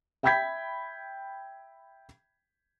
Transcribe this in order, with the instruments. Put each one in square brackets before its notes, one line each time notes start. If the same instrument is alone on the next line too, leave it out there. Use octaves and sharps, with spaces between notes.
[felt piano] E5 G5 B5 G6 G#6 B6